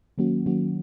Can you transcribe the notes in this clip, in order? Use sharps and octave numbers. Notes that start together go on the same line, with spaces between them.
D#3 F#3 A#3 C#4 F#4
D#3 F#3 A#3 C#4 F#4